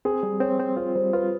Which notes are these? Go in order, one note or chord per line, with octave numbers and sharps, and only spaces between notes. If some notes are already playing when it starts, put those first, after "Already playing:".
C4 G#4
G3
C4 C#5
C4
F4 C5
G3 C5
F4 B4